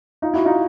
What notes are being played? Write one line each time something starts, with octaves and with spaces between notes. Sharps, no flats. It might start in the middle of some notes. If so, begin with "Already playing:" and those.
D#4 F4
E4 F#4
D#4 F4